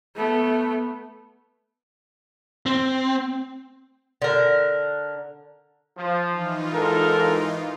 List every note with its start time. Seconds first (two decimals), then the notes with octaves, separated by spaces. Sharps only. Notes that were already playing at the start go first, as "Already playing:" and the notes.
0.16 A3 B3
2.66 C4
4.22 D3 A#4
5.98 F3
6.30 E3 D#4 F4
6.73 G#2 A4 A#4